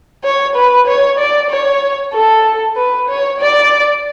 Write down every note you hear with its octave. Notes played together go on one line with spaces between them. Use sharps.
C#5
B4
C#5
D5
C#5
A4
B4
C#5
D5